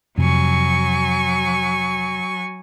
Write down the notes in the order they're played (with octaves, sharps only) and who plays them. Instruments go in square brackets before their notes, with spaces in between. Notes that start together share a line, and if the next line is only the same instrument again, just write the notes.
[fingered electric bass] F2 C3 [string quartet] F#3 G#5 C#6